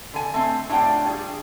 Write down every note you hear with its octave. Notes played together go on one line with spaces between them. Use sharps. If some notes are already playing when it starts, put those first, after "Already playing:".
D3 G#5
A3 C4
A2 D4 F4 D5 G5
G3 G#4